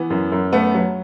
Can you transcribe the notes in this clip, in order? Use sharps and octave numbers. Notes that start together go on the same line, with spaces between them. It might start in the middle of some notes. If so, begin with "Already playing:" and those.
Already playing: E3 B3
F#2
F#2
A3 B3
F#3